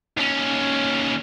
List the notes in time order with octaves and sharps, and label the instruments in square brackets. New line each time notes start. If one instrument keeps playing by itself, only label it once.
[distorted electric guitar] D#2 C#4